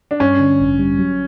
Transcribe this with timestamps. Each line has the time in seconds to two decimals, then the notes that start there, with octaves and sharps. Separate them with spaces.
0.11 D4
0.20 G2 C#4
0.40 D3
0.60 A1
0.79 G3
0.99 F#3